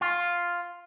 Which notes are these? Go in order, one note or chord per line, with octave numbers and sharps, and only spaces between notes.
F4